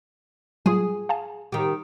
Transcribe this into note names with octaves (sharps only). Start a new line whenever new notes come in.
F#3 G3 F4 G#4
F5 G#5 A5
D#3 G4